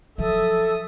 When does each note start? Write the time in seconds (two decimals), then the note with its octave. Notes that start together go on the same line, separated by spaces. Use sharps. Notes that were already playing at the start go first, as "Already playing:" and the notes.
0.18 F3 F#3 A4 E5 D#6